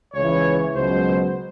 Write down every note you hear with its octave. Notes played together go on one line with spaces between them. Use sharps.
C#2 C#3 E3 C#5
C#2 B2 F#3 C5